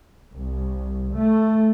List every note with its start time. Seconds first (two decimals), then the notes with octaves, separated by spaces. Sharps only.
0.32 C2
1.13 A3